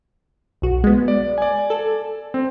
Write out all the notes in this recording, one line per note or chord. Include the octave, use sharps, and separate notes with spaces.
B1 F#4
G#3 B3
D5
D5 G#5
A4
C4